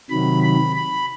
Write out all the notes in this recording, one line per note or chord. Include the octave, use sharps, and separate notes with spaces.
C3 D#3 F#3 B5
B5
B5